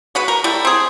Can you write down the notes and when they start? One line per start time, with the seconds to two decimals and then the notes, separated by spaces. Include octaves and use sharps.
0.15 G#3 F#4 B4
0.28 A#4
0.44 G3 A3 E4
0.65 C4 G#4